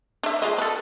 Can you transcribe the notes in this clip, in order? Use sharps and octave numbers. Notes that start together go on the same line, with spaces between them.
D4 E5
G#3 F4 D#5
A4 B4